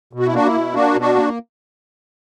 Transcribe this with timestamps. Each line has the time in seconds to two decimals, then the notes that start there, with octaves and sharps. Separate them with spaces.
0.13 B2
0.19 F#4
0.27 E4
0.33 A#3 D4 F#4
0.46 E4
0.53 B2
0.74 A#3 D4 F#4
0.94 B2
1.00 D4 F#4
1.15 A#3